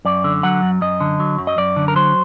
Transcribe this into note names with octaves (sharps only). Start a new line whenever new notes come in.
F#2 D5
D3
F#3 F#5
F#2
F#2 D#5
D3
F#3
F#2
D#5
F#2 D5
D3
A#4
F#3 C5